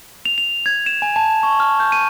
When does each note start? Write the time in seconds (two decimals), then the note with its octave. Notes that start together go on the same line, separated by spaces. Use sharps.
0.25 F7
0.38 F7
0.66 G#6
0.86 E7
1.02 G#5
1.16 A5
1.43 C#6
1.60 F6
1.80 G6
1.92 D#7